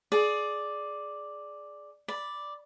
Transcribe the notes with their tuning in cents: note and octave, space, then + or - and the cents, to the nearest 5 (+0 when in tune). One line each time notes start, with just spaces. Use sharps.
G#4 +15 D5 +0
D5 +0 B5 +0